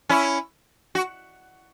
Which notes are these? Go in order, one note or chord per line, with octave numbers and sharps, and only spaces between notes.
C#4 E4
F#4